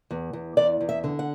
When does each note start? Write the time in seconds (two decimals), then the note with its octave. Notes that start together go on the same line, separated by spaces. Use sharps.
0.11 E2
0.33 E2
0.57 E2 D5
0.81 E2
0.89 E5
1.04 D3
1.19 F#5